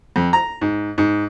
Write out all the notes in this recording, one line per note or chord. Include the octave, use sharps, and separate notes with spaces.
F2
A#5
G#2
G#2